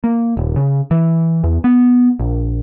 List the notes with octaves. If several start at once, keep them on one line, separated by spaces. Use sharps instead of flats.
A#3
D#1
C#3
E3
E2
B3
A#1